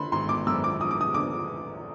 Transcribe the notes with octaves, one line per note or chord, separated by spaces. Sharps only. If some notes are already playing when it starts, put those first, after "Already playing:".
Already playing: D3 B5 C6
G#1 C6
D6
F#2 E6
D6
F3 D#6
D6
D#6
D3 D6